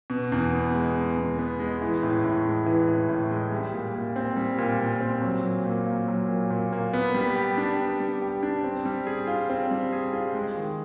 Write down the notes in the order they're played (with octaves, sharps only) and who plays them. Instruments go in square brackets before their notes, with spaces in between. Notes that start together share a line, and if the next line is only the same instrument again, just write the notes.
[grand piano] B2
E2
B3
G#3
B2
E2
B3
G#3
E3
A2
A2
G#3
E3
A2
A2
G#3
G3
A#2
A#2
C4
G3
A#2
A#2
C4
F#3
A#2
A#2
A#3
F#3
A#2
A#2
A#3
B3
G3
G4
D4
B3
G3
G4
D4
C4
G3
G#4
F4
C4
G3
G#4
F4
G#3
D#3